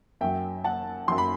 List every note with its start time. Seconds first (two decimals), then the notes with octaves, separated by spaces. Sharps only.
0.21 F#2 F#3 E5 G5
0.64 F#5 A5
1.08 F#2 F#3 C6
1.18 B5